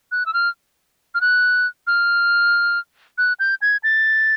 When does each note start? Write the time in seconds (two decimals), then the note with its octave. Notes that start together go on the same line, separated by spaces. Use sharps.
0.12 F#6
0.26 E6
0.34 F6
1.15 F6
1.21 F#6
1.87 F6
3.18 F#6
3.40 G6
3.62 G#6
3.83 A6